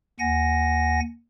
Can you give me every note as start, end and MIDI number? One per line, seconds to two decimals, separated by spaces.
0.20 1.00 39
0.20 1.00 78
0.20 1.00 80
0.20 1.00 94